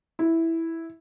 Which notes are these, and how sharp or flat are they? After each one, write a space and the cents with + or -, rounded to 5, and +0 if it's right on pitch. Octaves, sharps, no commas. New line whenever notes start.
E4 -5